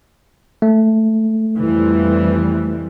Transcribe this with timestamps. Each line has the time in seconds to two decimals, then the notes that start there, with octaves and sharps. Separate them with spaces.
0.62 A3
1.56 F2 E3 G3